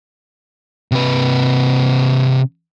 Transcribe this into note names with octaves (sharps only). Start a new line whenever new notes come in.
C3 B4